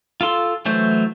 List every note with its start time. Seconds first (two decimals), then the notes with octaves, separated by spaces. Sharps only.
0.21 F4 A4 C6
0.66 E3 F#3 A3 C5